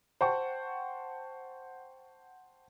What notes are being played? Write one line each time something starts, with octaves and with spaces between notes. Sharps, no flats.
C5 F#5 G5 A5 C#6